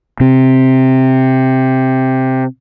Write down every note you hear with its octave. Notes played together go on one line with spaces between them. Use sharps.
C3 C4